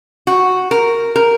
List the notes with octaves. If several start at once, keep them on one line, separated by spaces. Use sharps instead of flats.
F#4
A#4
A#4